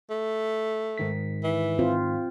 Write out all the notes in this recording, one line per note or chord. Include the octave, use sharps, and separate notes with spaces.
A3
G#2 D#3 B6
E3
C4 F4 C5